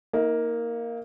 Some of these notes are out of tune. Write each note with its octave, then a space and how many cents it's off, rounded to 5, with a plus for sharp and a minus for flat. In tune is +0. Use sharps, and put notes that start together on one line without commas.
A#3 +0 D#4 +35